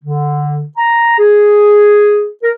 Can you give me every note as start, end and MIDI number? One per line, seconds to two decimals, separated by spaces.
0.04 0.63 50
0.77 1.16 82
1.19 2.27 68
2.43 2.50 70